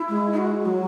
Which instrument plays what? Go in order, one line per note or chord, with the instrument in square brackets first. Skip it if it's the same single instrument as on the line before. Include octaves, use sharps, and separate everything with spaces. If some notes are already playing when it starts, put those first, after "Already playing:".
Already playing: [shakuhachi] E4
[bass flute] G#3
[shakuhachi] E4
F#4
[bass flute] F#3 [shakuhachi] F#4